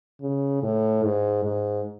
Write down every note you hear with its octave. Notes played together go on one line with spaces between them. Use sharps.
C#3
A2
G#2
G#2